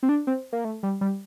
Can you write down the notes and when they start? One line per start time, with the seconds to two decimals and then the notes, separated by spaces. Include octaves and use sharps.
0.03 C4
0.09 D4
0.27 C4
0.53 A#3
0.65 A3
0.83 G3
1.01 G3